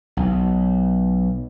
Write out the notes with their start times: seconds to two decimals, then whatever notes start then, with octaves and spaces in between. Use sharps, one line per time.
0.17 B1